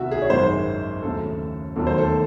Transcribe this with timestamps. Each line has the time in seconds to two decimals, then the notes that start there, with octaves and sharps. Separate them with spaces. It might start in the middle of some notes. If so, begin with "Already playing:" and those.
Already playing: C2 C3 D#3 F#4 E5
0.11 G#4
0.22 C#5
0.30 G#1 F#2 D#3 G#3 C5
1.02 D#2 C#3 F#3 A3 A4
1.76 E1 D#2 D#3 F#3 A3 A4
1.87 C5
1.98 A4